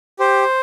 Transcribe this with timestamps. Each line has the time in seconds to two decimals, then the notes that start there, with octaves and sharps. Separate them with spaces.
0.19 G4 C5